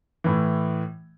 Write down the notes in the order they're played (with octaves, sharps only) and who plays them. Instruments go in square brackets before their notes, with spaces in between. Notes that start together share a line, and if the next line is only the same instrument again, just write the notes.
[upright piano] A2 E3